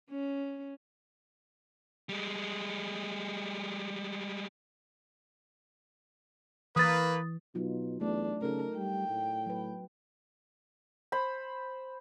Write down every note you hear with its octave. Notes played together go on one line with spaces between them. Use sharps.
C#4
G3 G#3
E3 A#3 B4 D#6 A6
B2 F#3 D#4 F4
E2 A3 D4
C#3 A3 D#4 A4 A#4
G3 G5
A2
F#3 B4
C5 B5